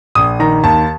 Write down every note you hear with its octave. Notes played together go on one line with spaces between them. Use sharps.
A#1 D#6
D#3 A#5
D#2 A5